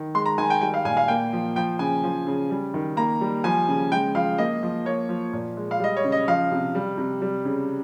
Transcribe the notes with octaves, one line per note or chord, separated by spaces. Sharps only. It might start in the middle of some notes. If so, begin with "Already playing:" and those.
Already playing: D#3
G#3 C6
A#5
D#3 G#5
G5
G3 G5
F5
A#2 G#5
F5
A#3 G5
F3
F3 G5
C#3 G#5
F3
C#3
G3
D#3
A#3 A#5
G3
F3 G#5
C#3
G#3 G5
F3 F5
A#3 D#5
F3
A#3 C#5
F3
A#2
G#3
F5
G3 D#5
C#5
C#3
D#5
F3 F5
C3
G3
C3
G3
C#3